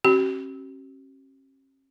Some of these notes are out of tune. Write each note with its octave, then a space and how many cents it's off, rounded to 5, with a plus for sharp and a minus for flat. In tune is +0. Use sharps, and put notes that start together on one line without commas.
C#4 -45 F#4 +45